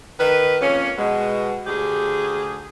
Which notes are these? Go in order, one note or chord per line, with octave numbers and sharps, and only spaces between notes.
D#3 B4
F2 A#3 C#4
B2 G#3
D2 G4 G#4